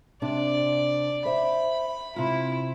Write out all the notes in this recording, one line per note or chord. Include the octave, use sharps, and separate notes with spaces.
C3 D4 D5
C5 E5 B5
C3 E4 F4